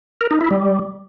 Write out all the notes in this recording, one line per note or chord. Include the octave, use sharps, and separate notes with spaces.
A#4
D#4
E4
G3